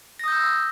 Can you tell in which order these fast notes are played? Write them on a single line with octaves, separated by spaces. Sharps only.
A#6 D#6 G6 E6